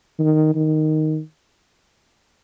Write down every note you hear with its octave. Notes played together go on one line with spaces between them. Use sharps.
D#3
D#3